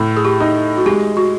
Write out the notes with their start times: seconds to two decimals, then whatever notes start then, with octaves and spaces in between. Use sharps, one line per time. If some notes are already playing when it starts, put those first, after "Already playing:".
Already playing: A2
0.17 G#4
0.25 G4
0.40 D#4
0.77 F#4
0.86 G#3 G4
1.17 F#4